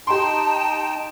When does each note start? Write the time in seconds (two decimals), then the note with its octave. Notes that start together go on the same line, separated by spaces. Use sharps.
0.07 D#4 G4 G5 A5 C6